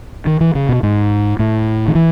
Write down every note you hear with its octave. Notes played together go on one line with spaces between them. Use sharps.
D#3
E3
C#3
B2
G#2
A2
D#3
E3